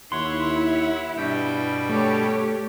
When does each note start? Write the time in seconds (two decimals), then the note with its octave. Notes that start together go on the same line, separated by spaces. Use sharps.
0.12 D#2 E4 C#5 F#5 C6
1.17 G2 B2 G3 G5
1.89 A3 G4 C#5